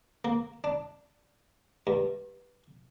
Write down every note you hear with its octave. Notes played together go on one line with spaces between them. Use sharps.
A#3
D4
G2